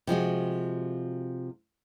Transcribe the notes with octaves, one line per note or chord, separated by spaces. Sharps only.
C3 F3 G#3 F#4